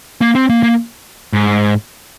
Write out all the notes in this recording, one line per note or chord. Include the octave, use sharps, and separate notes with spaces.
A#3
C4
A#3
A#3
G#2